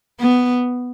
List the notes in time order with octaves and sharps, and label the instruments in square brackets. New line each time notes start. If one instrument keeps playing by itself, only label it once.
[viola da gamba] B3